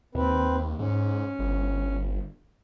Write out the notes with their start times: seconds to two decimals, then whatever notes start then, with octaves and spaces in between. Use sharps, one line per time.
0.15 D#2 C4 B4
0.79 G#2 C#4
1.39 G1